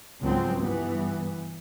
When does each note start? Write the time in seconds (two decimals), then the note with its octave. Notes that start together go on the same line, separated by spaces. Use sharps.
0.21 C#2 G#2 F3 F#3 C4
0.60 G2 E3 B3